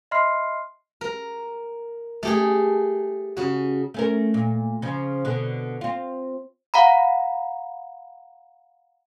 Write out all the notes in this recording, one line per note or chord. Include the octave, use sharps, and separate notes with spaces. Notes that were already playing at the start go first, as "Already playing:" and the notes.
D#5 E5 B5 C6 F6 C7
A#4
A3 G4 G#4
C#3 F#4
A3 C#4 A#4
A#2
C#3 F3
B2 D3
C4 F4
F5 F#5 A#5 B5